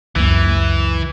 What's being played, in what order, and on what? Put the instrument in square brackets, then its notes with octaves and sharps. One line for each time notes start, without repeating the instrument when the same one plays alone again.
[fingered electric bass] C#2 F#2 A#3 [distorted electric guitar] E3